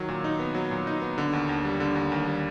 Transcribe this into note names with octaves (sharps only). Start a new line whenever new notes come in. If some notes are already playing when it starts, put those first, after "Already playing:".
Already playing: D#3 F#3
A#2
D#4
B3
F#3
A#2
D#4
B3
D3
D#2
D#2
G3
D3
D#2
D#2
G3